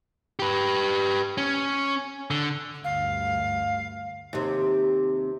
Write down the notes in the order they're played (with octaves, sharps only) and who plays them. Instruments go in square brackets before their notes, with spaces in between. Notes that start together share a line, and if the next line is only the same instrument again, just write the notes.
[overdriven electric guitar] G4 B4
C#4
D3
[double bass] D2 G2 [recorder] F5
[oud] D#2 C3